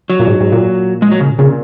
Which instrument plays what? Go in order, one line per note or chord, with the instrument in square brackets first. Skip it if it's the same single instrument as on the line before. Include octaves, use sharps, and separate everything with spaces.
[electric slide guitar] F#3
[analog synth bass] A#2
G#2
G#2
A#2
[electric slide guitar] G#3
F#3
C#3
[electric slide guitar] A#2 [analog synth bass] C#3